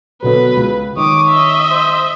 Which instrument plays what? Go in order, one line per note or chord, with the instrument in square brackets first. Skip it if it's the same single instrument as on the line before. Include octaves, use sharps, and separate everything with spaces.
[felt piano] B2 D3 F#3 [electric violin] B4
[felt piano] C#2
[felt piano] D#3 [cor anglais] C#5 [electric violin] D6 D#6
[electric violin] D#5 E5
[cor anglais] C5